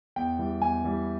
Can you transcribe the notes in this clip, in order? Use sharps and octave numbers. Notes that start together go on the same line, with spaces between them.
E2 G5
E3 G3
E2 G#5
E3 G3